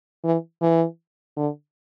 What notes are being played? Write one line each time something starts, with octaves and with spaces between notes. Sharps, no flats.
E3
E3
D3